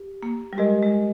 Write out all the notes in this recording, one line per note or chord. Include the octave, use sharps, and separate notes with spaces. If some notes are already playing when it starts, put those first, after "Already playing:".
Already playing: G4
A#3
G3
G#3 G4 A#4 D#5
G#3